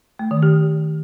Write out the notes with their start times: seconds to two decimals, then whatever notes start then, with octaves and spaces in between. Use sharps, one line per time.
0.19 A3
0.31 D#3
0.43 G4